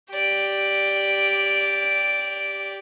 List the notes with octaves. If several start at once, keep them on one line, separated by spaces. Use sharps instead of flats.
G4 D5